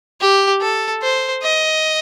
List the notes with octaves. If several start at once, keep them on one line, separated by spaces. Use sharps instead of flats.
G4
A4
C5
D#5